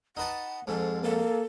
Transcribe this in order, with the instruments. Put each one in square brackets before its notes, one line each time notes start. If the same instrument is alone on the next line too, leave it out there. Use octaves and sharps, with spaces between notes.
[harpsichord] D#4 B4 A5 [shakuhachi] F#5
[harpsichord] F2 G#2 [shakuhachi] A4
[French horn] A#3 [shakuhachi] A4